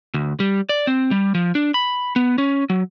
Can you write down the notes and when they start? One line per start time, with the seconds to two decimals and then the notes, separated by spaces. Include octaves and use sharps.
0.14 D2
0.40 G3
0.69 D5
0.87 C4
1.11 G3
1.35 F3
1.55 D4
1.74 B5
2.16 B3
2.38 C#4
2.70 F#3